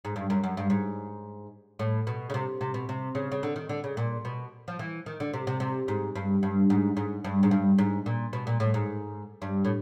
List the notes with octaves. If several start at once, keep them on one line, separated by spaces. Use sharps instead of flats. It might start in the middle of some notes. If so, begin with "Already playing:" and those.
G#2
G2
F#2
F#2
G2
G#2
A2
B2
C#3
C3
C3
B2
C3
C#3
C#3
D3
D#3
D3
C#3
A#2
B2
F3
E3
D#3
D3
C3
C3
C3
G#2
G2
G2
G#2
G#2
G2
G#2
G2
G#2
A#2
B2
A#2
A2
G#2
G2
A2